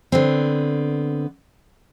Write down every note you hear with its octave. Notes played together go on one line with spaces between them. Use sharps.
D3 B3 C4